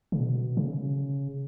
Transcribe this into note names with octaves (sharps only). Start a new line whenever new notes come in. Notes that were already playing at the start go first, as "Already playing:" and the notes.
C#3
B2
C#3